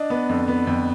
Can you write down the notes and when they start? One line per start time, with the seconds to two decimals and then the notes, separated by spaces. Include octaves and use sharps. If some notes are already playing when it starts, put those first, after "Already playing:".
Already playing: D4 D#5
0.10 B3
0.29 F2
0.48 B3
0.67 F2